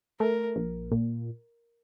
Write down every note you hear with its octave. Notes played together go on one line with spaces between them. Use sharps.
A3 A#4
A#1
A#2